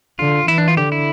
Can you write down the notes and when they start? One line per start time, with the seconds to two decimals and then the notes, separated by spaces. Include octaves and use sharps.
0.19 D3 F4
0.48 E3 E4
0.58 D4
0.68 F4
0.77 D3 G4
0.92 E4